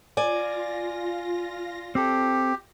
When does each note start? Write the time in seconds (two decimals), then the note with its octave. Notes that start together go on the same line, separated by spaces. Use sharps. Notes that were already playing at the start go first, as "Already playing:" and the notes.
0.17 F4 D5 G#5 A#6
1.95 C4 G4 A4